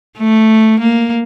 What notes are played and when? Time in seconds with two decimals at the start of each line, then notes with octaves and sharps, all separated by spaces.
0.18 A3
0.80 A#3